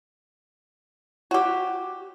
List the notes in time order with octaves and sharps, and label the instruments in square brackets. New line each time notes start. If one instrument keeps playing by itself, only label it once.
[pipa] F#4 G4